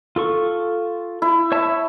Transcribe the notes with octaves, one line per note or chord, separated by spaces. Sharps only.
F4 A4 C#6
E4
C#5 E5 A5